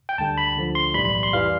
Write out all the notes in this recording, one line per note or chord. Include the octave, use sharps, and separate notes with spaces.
G5
D2 D3 G3 A5
B5
D2 D3 F3
C6
B1 A2 E3 G3 B5
B5
C6
F2 E3 G3 F5